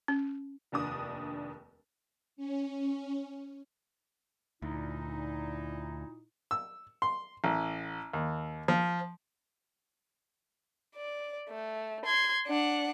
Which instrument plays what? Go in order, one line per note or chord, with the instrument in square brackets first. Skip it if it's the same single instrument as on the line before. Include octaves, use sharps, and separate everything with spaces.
[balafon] C#4
[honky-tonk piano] F1 D#2 D4 D#6
[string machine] C#4
[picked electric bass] D2 [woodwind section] A#2 D#4 E4
[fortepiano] E6
C6
A1
D#2
F3
[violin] D5
A3
C6 G#6
D4 F#5